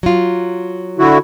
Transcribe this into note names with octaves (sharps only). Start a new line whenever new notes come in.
F#3 F4
D3 E4 F#4